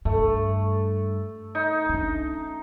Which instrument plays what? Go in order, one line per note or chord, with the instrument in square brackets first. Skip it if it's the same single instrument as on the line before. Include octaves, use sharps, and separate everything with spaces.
[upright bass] G2 [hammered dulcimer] A3
[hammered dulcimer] D#4
[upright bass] C#4 D4